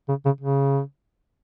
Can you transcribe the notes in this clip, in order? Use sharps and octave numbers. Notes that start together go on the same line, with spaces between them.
C#3
C#3
C#3